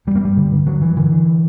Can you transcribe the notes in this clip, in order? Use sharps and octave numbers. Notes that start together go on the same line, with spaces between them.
G2 G3
A#3
G2 G3
D3
D3
G2 F#3
G2 E3
D3 E3
D3